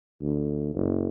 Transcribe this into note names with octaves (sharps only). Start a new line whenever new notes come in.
D2
F#1